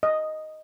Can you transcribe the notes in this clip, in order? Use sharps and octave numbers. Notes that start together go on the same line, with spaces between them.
D#5